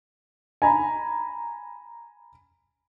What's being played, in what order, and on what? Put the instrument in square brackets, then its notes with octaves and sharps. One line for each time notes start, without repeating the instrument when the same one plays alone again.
[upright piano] G#5 A#5 B5